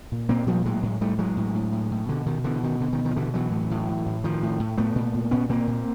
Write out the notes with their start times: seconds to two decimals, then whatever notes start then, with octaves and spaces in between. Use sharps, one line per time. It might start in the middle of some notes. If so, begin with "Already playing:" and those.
0.12 A#2
0.29 A#2 A#3 C4
0.47 A#2 F3 G3
0.65 A2 F#3 G#3
0.83 A2
1.01 A2 G3 A3
1.19 A2 F#3 G#3
1.36 A2
1.55 A2
1.73 A2
1.91 A2
2.09 B2 D3
2.26 B2 D#3
2.44 B2 D3 E3
2.63 B2 D#3
2.80 B2 D3
2.93 D#3
2.98 B2
3.05 D#3
3.11 F3
3.16 B2 D3 E3
3.34 B2 E3 F#3
3.52 A2
3.71 A2
3.88 A2
4.06 A2
4.24 A2 D#3 F3
4.43 A2
4.60 A2
4.78 A2 A3 B3
4.95 A#2
5.14 A#2
5.31 A#2 B3 C#4
5.49 A#2 A#3 C4
5.67 A#2